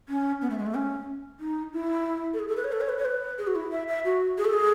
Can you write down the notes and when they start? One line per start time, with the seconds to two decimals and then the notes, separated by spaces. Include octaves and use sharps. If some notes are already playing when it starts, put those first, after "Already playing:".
0.09 C#4
0.41 B3
0.50 A3
0.58 G#3
0.66 A3
0.75 C#4
1.40 D#4
1.73 E4
2.34 A4
2.39 G#4
2.48 A4
2.57 B4
2.64 C#5
2.72 A4
2.81 C#5
2.89 B4
2.98 C#5
3.05 B4
3.38 G#4
3.47 F#4
3.55 E4
3.72 E5
3.88 E5
4.05 F#4
4.38 G#4
4.45 A4
4.53 G#4